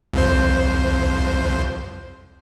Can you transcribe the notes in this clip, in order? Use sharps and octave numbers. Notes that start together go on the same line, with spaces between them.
C2 F2 C5